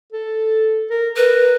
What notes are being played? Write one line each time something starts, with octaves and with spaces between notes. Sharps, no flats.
A4
A#4
A#4 B4